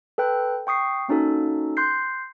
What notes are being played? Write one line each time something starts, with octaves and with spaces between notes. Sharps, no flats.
A4 B4 G5 F#6
G5 C#6 D#6 C7
A#3 C#4 D#4 F#4 A4
C6 F#6 G6 C7